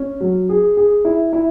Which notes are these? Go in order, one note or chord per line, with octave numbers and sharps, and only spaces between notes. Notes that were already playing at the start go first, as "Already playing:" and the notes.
Already playing: C#4
F#3
G#4
G#4
E4
E4